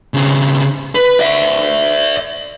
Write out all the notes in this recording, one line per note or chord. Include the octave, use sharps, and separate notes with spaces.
C#3 C4
B4
D5 E5